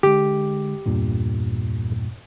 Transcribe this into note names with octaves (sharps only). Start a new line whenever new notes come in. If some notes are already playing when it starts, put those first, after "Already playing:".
D3 G#3 G4
E2 G2 A#2